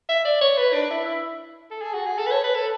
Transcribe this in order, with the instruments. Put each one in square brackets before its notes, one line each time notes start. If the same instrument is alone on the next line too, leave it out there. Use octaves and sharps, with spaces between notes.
[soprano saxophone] E5
D5
C#5
B4
D4
E4
E4
A4
G#4
F#4
G#4
A4
B4
C#5
B4
A4